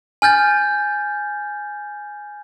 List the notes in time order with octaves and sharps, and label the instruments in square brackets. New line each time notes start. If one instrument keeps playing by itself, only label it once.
[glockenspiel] G#5 F6 G6 A6